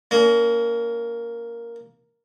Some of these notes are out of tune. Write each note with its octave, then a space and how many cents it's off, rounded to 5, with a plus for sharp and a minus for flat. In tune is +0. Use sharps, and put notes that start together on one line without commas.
A#3 +0 C#4 +40